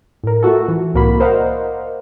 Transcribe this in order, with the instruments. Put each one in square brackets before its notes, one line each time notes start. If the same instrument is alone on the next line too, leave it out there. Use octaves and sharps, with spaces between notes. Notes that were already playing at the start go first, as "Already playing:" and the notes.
[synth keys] A2 A#4
A3 F4 F#4 A4
E3
C2 A2 A#3 F#4 B5
A#4 C5 D5 D#5 F5 F#5